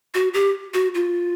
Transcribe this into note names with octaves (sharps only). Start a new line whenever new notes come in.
F#4
G4
F#4
F4